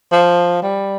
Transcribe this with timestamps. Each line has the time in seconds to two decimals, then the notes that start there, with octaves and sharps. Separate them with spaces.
0.12 F3
0.63 G3